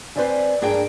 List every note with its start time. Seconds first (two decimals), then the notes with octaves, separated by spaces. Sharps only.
0.16 C4 B4 C5 D5 E5 G#5
0.61 G2 D4 G#4 A#4 G5